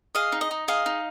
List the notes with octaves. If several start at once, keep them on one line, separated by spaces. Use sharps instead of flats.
G#4 D#5 F5
D#4
D#5
D#4
G#4 D#5 F5
D#4